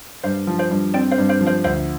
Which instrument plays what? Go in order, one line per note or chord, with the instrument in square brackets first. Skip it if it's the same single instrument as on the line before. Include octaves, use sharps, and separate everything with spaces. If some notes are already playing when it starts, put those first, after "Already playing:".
[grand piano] G2 [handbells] C5 F5
[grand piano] F3
[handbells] C5 F5
[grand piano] G2
[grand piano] C4 [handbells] D5 G5
[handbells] C5 F5
[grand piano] G2
[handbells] C5 F5
[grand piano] F3
[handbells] C5 F5
[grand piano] D2 [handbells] C5 F5